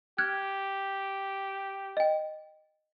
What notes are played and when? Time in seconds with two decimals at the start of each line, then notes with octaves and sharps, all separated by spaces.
0.18 G4 F6 F#6 G#6
1.97 D#5 G5